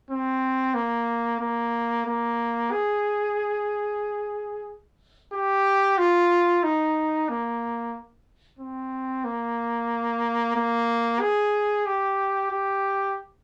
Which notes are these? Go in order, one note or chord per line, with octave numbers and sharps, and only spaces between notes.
C4
A#3
A#3
A#3
G#4
G4
F4
D#4
A#3
C4
A#3
A#3
G#4
G4
G4